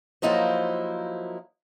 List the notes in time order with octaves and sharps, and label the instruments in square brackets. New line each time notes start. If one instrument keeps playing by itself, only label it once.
[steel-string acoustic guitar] F3 F#3 A#3 D#4 E4 C5